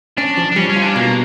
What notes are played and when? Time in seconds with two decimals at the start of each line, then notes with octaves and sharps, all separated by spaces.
0.17 C#4 D4
0.37 F3
0.52 D4
0.56 G3 C#4
0.69 C#4
0.76 F4
0.82 D4
0.95 B2 A#3